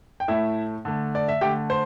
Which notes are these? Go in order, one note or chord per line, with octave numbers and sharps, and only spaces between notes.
G5
A2 A3 E4 E5
D3 A3
D5
E5
D3 A3 G4 G5
C5